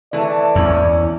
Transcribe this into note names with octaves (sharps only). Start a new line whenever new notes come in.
E3 A3 D5
E2 C#4 E4